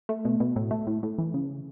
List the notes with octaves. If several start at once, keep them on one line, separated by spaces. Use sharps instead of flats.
A3
B2
B2
A2
A3
A2
A2
E3
C#3